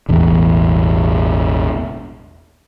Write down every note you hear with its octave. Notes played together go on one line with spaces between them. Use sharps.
E1 A1 E2